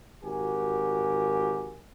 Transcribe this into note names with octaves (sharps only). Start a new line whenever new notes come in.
G#1 F#4 G4 A#4 G#5